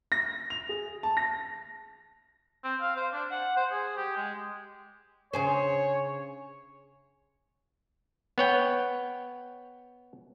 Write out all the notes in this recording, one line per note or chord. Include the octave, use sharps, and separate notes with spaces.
A#6
F7
G#4
A5
A#6
C4
F5
C5
D4
F#5
C5
G#4
G4
G#3
C#3 G#4 C5 C#5
B3 C#5 G5